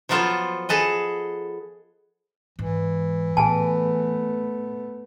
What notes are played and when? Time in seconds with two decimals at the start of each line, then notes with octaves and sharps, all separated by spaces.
0.09 F3 F#3 B3 F4 A4 C5
0.69 G#4 A4 B4 D#5
2.59 G#2 E3
3.37 A2 A3 B3 G#4 G#5 A5